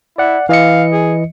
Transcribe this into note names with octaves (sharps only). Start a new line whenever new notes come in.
E4 D5 F#5
E3 D#5 F5 C#7
G#4